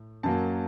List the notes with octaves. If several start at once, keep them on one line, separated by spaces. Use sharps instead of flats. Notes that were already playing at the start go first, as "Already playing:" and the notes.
Already playing: A2
F#2 F#3 A#3 A5